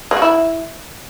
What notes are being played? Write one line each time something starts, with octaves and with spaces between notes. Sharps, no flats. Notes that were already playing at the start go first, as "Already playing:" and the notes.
G#3
F#4
E4